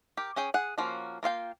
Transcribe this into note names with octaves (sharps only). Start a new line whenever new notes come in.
G4 A#4
C#4 G#4 G5
G#4 F#5
F3 A#3 C#4 F#4
A#3 F4 F5 G5